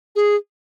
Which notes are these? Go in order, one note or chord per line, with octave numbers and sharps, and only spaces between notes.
G#4